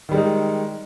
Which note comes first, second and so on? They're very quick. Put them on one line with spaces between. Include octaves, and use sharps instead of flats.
D#3 G3 G#3 D#4